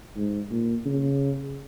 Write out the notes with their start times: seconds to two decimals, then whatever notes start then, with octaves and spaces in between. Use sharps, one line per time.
0.16 G#2
0.51 A#2
0.85 C#3